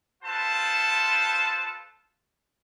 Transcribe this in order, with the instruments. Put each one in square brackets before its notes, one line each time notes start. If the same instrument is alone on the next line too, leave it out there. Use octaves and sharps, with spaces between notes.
[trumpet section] F4 A4 B4 C5 A5